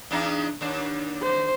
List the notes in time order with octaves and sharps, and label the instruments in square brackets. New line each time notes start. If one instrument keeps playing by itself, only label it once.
[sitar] E2 D4 D#4
D#2 D4
[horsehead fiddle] C5